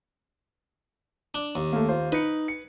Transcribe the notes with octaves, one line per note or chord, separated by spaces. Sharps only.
D4
D#2
A3 A#3
F4 C5
D#4 B4 C#7
C#7